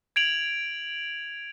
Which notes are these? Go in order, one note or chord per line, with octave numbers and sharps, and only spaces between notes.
G#6 D7 F7 F#7